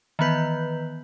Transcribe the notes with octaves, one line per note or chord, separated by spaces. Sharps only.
D#3 E3 B3 B4 G6